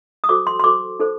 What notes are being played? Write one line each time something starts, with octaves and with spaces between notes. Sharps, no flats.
D#6
F#4 A4 C5 D6
C6
C6
F#4 A4 C5 D6
D#4 A4 C5